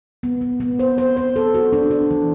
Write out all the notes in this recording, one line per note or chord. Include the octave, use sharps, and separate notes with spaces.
B3
B3
B3
C5
C5
C5
A4
F#4
D4
D4
E3